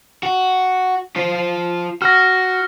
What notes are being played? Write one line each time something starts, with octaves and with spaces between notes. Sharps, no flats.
F#4
F4 C5
F#4 F6 A#6